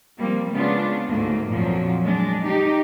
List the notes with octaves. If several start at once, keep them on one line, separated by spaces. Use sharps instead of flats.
F3 G3 A#3 C4
C#3 G#3 B3 D4 F4
D2 G#2 A3 A#3
F2 A#2 F3 F#3
G#3 D4
D#4 G4